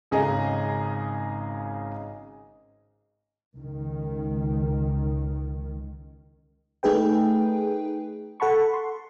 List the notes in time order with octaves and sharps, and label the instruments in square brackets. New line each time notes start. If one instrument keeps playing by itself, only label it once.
[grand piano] G#1 C#3 G#4 D#5 A#5
[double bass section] C#2 D#3
[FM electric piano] A3 D#4 G#4 B4 G5
A4 F#5 A5 B5 C#6
C6